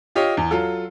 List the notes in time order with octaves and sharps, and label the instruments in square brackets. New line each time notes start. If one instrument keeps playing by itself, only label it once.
[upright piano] F4 G4 C#5 D#5
E2
F#3 F4 A4